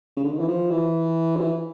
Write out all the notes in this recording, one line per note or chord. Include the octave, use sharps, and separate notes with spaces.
C#3
D3
D#3
E3
F3
E3
F3
E3